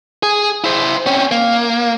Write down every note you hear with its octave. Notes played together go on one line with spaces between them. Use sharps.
G#4
E4 C5
C4 C#4
A#3